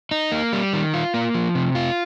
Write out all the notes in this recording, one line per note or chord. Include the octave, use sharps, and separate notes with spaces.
D#4
A#3
G3
D#3
F4
A#3
F3
C3
F4